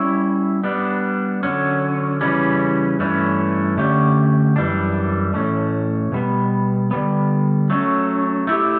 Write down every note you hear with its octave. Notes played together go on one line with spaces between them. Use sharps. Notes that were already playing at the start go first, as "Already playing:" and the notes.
Already playing: G3 C#4 E4
G3 B3 D4
D3 F#3 C#4
C#3 E3 G3 C#4
G2 E3 A3 C#4
D3 A3 C#4 G4
F#2 E3 G3 D4
A2 E3 A3 C#4
B2 G3 B3
D3 G3 B3
F#3 A3 C#4
A3 E4 G4